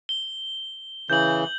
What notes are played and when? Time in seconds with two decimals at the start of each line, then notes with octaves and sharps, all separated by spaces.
0.09 G7
1.10 C#3 E3 G6 F#7